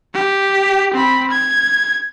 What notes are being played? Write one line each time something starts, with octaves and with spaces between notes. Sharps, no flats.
G4
C4 B5
G#6